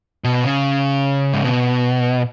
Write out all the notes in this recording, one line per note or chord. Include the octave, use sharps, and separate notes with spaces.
B2
C#3
G#2
B2